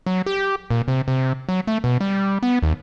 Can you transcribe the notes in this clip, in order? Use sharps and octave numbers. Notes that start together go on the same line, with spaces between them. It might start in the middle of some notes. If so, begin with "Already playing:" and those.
F#3
G4
A#2
C3
C3
F#3
A3
B2
G3
B3
D#2